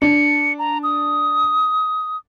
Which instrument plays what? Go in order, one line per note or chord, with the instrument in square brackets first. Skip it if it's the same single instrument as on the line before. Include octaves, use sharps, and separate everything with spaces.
[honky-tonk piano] D4 [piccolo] C#7
[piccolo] A#5
D#6